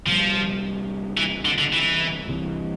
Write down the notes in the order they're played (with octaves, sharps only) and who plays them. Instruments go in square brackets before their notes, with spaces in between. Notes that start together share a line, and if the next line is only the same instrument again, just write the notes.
[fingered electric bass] C2 A#2 G3 [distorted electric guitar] F3
[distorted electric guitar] E3
D3
D3
E3
[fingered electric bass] C2 C3 E3